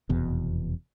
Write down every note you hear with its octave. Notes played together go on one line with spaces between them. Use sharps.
F1 E2 B2